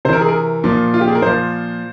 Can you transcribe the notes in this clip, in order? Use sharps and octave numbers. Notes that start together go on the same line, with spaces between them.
C3 E3 A#4 C5
G#4
A#4
A#2 F3
F4
G4
G#4
A#4
A#2 F3 C5